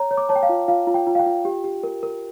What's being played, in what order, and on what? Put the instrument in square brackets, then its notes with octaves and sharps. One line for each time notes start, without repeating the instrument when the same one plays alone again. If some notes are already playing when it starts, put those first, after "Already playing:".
Already playing: [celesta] C#5 A#5
C#5
D6
C#5 A5
G5
F5
F4
F4 F5
F4
G5
F4
F5
G5
F4
G4
G4
A#4
A#4